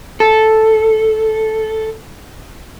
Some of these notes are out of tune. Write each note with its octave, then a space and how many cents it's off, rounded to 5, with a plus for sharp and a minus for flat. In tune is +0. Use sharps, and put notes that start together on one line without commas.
A4 -5